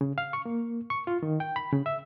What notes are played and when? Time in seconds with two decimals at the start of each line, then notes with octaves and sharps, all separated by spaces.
0.01 C#3
0.18 F5
0.33 C#6
0.46 A#3
0.90 C#6
1.07 F4
1.23 D#3
1.40 G5
1.56 B5
1.73 C#3
1.86 E5